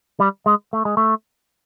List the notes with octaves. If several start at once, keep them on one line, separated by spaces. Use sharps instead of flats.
G3
G#3
A3
G#3
A3